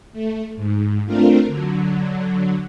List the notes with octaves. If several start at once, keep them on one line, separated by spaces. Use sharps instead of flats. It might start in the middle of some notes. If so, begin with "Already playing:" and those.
A3
G#2
A3 C4 D4 F4 A#4
D3 F#3